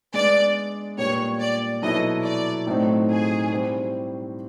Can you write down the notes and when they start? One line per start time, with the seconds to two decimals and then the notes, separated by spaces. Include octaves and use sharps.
0.14 G#3 B3 D4 D5
0.98 A#2 G3 B3 D4 G4 C#5
1.40 D5
1.82 B2 F#3 B3 E4 A4 D#5
2.25 D5
2.67 A2 F#3 A3 C4 D#4
3.09 G#4
3.51 G3 C4 E4 G4 C5